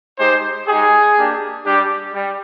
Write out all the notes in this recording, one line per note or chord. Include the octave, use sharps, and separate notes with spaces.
G#3 D#4 G4 C5
G#3 D#4 G4 G#4
A#3 D4 G4
G3 D4 G4
G3